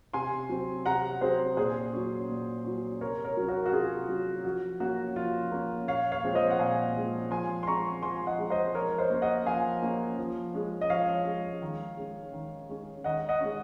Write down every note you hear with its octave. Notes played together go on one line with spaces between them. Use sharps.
C3 G#5 C6
F#3 C4
C3 F#5 A#5
F#3 C4 G#4 C5
A#2 G#4 C5
F#3 C#4
A#2
F#3 C#4
C3 A#4 C#5
A#4 C#5
F#3 C#4
F#4 A#4
F#4
C3 F4 G#4
F#3 C#4
F3 F#4
A#3 C#4 F#4
F3 F4
A#3 C#4
A#2 C#5 F5
C#5 F5
F3 G#3 C4
C5 D#5
F#5
A#2 F5 G#5
F3 G#3 C4
F3 G#5 C6
C6
G#3 C4 A#5 C#6
F3 G#5 C6
D#5 F#5
G#3 C4
C5 D#5
F3 A#4 C#5
C5 D#5
A#3 C#4
D#5 F#5
F3 F5 G#5
A#3 C#4
F3
G#3 C#4
D#5
F3 C#5 F5
G#3 C#4
D#3
G#3 C#4
D#3
G#3 C#4
D#3 D#5 F#5
D#5 F#5
G#3 C#4